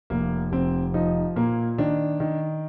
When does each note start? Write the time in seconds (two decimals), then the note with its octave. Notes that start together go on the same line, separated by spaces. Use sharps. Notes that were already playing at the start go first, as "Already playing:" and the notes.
0.10 F1 A#3
0.52 F1 C4
0.94 F3 D#4
1.36 A#2 A#3
1.78 D#3 D4
2.20 D#3